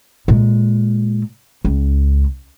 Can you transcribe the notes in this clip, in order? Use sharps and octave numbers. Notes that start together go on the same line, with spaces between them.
A#2 G#3
C#2